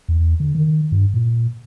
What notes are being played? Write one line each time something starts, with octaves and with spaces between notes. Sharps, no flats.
E2
D3
D#3
G2
A#2